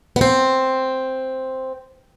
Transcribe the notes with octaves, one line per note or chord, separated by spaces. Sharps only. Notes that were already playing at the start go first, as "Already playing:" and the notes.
B3
C4